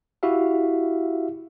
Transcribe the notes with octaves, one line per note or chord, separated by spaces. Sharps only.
E4 F#4 G4 E5 F5